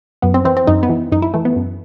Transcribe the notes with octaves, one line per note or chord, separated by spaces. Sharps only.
F#2 B3
C4
E3 C4
C4
F#2 D#4
B3
E3
F#2 D#4
E4
E3 A3
B3
F#2